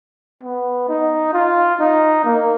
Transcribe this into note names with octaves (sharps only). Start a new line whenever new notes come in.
B3
D#4
F4
D#4
A#3